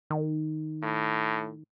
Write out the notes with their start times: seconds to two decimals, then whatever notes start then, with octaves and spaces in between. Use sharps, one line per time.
0.10 D#3
0.83 A2